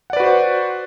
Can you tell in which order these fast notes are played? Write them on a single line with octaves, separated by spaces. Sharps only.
F#5 D5 B4 F#4 C5